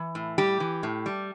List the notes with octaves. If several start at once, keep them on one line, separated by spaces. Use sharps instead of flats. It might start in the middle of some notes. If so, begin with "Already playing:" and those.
Already playing: E3
A2
G3 G4
E3
A2
G3